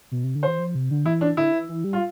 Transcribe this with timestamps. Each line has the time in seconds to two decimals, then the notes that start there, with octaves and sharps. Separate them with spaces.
0.11 B2
0.24 C3
0.35 D3
0.43 E3 C5
0.59 F3
0.75 C3
0.91 D3
1.05 E3 E4
1.21 D4
1.37 D3 E4
1.53 E3
1.69 E3
1.84 G3
1.93 F4